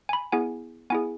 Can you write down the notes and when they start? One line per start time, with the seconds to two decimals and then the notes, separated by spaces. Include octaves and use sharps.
0.09 G#5
0.13 B5
0.32 B3 E4 G#4 G#5
0.90 B3 E4 G#4 G#5